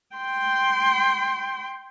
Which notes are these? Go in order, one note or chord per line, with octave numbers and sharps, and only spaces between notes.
G5 C6